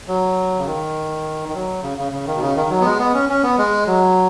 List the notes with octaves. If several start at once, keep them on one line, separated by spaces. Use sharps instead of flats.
F#3
C#3
D#3
D#3
F#3
C#3
C#3
C#3
D#3
B2
C#3
D#3
F#3
B3
G#3
B3
C#4
C#4
B3
G#3
F#3